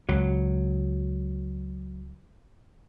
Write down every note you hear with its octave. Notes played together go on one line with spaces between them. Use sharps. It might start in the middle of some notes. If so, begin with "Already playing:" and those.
C#2 F#3